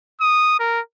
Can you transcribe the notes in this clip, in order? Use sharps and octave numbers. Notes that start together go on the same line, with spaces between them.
D#6
A#4